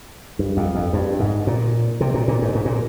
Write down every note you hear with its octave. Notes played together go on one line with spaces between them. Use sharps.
G2
F2
F2
G2
G#2
A#2
C3
A#2
A#2
G#2
G#2
A#2